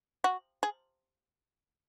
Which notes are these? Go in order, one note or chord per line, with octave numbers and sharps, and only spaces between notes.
F#4
G#4